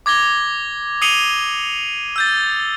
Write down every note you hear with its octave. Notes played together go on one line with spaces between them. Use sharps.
D6 G#6 A#6 G7
D#6 C7 C#7 D#7 F7 G7
E6 G6 A6